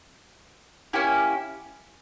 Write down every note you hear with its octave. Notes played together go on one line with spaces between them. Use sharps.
A#3 C#4 E4 G4